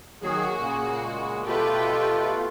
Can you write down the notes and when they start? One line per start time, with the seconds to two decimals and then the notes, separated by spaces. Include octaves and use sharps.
0.22 D#3 F#3 A#3 F#4 G#4
0.59 A#2 C#3 G#4
1.04 G#3
1.46 B2 A3 F4 G4 A4 B4 G5